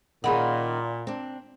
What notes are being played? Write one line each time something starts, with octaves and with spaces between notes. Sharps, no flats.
A#2 D#3 C#4 G#4 F#5 B5
C4 D4